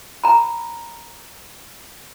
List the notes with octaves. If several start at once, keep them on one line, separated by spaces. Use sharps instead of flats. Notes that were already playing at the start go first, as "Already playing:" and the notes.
A#5 B5